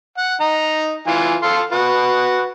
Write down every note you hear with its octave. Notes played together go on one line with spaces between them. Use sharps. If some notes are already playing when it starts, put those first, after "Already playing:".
F#5
D#4 A#5
E3 F4 G#5
A4 F5 C6
F#4 B4